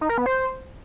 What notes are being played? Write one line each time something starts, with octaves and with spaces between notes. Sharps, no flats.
D#4
A#4
B3
C5